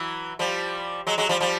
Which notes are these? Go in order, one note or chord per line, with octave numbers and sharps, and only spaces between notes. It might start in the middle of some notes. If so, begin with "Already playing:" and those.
Already playing: E3 F#3
F3 G3
F#3 G#3
F#3 G#3
F3 G3
F3 G3